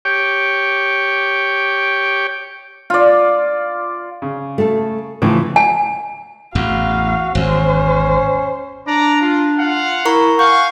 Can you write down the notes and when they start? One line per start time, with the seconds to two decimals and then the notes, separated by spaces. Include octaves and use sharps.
0.05 G4 C#5 G5 D6
2.90 F4 D5
4.22 C#3
4.58 A3 A4
5.22 A2 C#3 E3 F3
5.56 G#5
6.55 A1 E2 F#4 F5
7.35 G#1 E2 C#4 C5
8.88 D4 D5 A#5
9.22 F4
9.59 F4 F5 F#5
10.05 E4 A#4 A#5 C#6
10.39 F5 F#5 G#5 C#6 G6